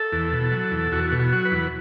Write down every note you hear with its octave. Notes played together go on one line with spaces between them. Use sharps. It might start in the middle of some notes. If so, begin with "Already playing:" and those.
Already playing: A4
E2
B2
F#3
E2
E2 F#4
B2
F#4
F#3
B4
E2